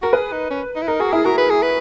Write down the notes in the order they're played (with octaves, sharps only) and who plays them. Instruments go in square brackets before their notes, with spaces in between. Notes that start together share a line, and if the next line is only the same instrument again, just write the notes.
[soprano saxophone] F#4 [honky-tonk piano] A#4
[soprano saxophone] G#4 [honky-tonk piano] B4
[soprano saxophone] D#4
C#4
D#4
E4
[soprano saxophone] D#4 [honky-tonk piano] A#4
[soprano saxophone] F#4 [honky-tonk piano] G#4
[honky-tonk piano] E4 [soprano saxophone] G#4
[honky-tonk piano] F#4 [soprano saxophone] A#4
[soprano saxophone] B4
G#4
B4